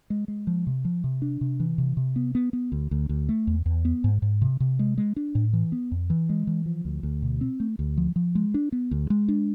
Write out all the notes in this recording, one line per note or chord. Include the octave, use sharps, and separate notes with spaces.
G#3
G#3
F3
C3
F3
C3
D4
C3
E3
C3
C3
B3
B3
B3
D2
D2
D2
A3
E2
E2
B3
G#2
G#2
C3
C3
G#3
G#3
D4
A2
E3
B3
F2
E3
G#3
E3
F3
D2
D2
B2
C4
A3
D2
F3
F3
G#3
D4
B3
D2
G#3
D4